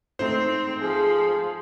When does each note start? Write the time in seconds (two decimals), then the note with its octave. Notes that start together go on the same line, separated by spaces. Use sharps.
0.19 G#2 A3 C4 D#4 C5
0.81 F3 G#4